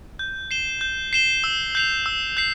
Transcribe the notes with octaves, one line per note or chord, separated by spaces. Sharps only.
G6
C7 E7 G7
G6
C7 E7 G7
E6
G6 C7 F7
E6
G6 C7